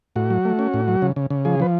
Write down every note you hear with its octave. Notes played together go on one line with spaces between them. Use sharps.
A2 F#4
F#3
A3
C#4
A2
F#3
C#3
C#3
C#3
F3 G#4
F3 B4